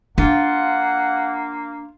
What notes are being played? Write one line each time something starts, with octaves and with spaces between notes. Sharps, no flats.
A#3 D4 F4 F5 F#5